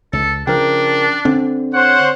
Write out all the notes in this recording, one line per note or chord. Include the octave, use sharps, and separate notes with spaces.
C#2 A4
C#3 F3 D4 A#4 G5
D3 C4
C5 C#5 F#5